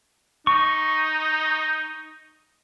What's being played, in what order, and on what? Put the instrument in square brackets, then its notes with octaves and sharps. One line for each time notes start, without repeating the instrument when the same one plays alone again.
[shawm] D#4 [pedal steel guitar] C#6